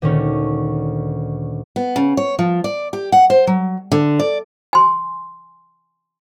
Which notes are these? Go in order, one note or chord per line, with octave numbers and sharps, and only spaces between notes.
D2 A#2 D#3 A3 C#4
B3
C#3
C#5
F3
D5
G4
F#5
C5
F#3
D3
D5
G#5 C6